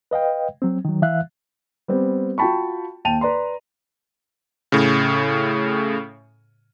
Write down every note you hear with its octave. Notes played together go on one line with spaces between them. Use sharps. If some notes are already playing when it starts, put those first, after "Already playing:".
B4 D#5 F5 G5
F#3 C4
D#3 F#3
E3 E5 F5 F#6
G3 B3 C4
F4 F#4 G5 A5 B5 C#6
D#2 G5 A5 D#7 F7
B4 D5 A#5 C6
A2 C#3